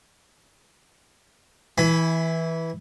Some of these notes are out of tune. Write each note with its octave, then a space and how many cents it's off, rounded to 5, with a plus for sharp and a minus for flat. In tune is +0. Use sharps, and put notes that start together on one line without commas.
E3 -10 G#5 +20 B5 +25